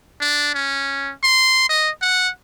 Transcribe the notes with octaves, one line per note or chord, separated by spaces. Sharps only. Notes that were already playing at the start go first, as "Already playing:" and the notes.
D4
C#4
C6
D#5
F#5